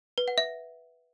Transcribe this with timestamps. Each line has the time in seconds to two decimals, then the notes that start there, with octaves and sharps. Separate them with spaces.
0.18 B4
0.28 F#5
0.38 E5